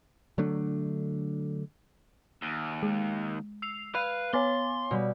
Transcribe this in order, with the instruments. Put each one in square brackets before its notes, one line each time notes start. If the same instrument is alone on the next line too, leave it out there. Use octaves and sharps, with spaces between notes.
[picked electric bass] D3 F#3 A3 D4
[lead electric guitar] D#2
[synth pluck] G#3
[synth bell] E6 C7 F7
[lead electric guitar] B4 [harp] F5 [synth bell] B5
[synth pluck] B3 [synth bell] C#5 G#5 D6 [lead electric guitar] C6 [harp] A6
[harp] B2 G3